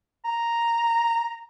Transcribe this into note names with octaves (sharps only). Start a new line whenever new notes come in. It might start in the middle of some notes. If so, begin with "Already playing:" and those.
A#5